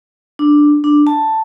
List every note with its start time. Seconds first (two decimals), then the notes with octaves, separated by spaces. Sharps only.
0.39 D4
0.84 D4
1.07 A5